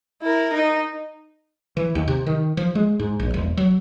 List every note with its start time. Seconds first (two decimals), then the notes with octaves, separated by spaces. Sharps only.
0.22 E4 A#4
0.53 D#4
1.77 E3
1.95 D#2
2.08 C3
2.27 D#3
2.57 F3
2.75 G#3
2.99 G#2
3.19 A#1
3.34 E1
3.57 F#3